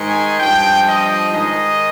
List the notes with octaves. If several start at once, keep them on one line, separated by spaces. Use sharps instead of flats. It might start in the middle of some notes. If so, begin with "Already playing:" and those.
Already playing: G#2 D#3
G#5
G2 F3 G5
D#5
G#2 D#3 D#5